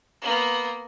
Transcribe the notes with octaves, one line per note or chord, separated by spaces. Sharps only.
A#3 B3